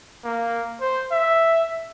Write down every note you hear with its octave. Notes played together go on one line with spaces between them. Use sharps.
A#3
C5
E5